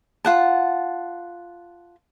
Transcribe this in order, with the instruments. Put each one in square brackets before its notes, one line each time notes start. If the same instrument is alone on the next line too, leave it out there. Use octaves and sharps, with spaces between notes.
[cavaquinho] F4 F#5 A5